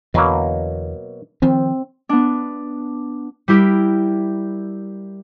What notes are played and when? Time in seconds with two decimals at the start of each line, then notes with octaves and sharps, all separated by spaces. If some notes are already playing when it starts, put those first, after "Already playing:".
0.14 E2 B2 D3 F#3 A#3
1.42 D#3 F3 C4
2.09 B3 D4
3.48 G3 E4 G4 A#4